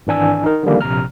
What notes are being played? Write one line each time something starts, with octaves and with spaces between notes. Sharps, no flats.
G#1 E3 D4 G#5 E6
D#4 A#4
D3 D#3 F3 G3 A#3
A#1 C3 A#5 F6